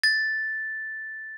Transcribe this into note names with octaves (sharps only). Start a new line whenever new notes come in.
A6